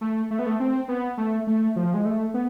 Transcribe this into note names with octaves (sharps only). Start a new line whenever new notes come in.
A3
A3
B3
A3
C4
B3
A3
A3
F3
G#3
A3
B3